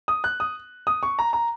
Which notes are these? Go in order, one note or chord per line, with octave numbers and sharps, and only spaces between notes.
D#6
F#6
D#6
D#6
C#6
A#5
A#5